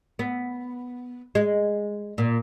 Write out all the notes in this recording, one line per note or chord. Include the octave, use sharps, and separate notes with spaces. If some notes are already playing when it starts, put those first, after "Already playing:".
B3
G#3
A#2